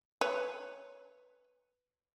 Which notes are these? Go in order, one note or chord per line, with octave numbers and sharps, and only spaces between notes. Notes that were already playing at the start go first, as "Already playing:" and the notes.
B4 C#5